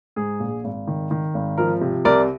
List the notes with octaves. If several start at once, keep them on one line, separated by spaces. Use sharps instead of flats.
G#2 G#4
A#1
G#1
D#3
D#3
G#1
F3 A#4
C3
C2 A#4 D5